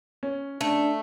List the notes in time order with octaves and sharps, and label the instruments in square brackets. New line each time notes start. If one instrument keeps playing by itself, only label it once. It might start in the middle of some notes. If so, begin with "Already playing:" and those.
[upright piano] C#4
[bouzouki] A3 [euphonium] D4